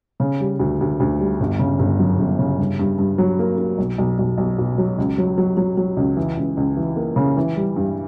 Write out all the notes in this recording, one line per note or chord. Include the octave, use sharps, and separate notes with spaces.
C#3
G3
D2
D2
D2
G3
G1
C#3
G1
F#2
G1
C#3
G2
G2
G2
F#3
A#3
A#3
B1
B1
B1
B1
B2
F#3
C#2
F#3
F#3
F#3
F#3
C#2
E3
C#2
C#2
E3
A#3
C#3
E3
G3
G2